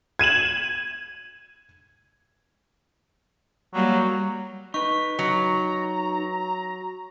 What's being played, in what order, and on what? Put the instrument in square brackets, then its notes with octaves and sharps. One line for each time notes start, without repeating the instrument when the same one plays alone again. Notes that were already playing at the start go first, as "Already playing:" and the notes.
[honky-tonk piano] G#6 D#7 E7 F#7
[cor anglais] F#3 [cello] G3 A#3
[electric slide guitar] D#4 B4 [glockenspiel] C#6 [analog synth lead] B6
[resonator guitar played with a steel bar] F#3 [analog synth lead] A#5